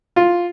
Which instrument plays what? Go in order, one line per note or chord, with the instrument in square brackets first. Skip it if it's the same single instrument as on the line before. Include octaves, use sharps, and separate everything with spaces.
[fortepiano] F4